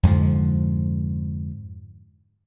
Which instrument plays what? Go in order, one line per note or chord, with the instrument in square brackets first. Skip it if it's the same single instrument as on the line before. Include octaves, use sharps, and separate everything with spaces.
[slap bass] F2 G#2 D3 F3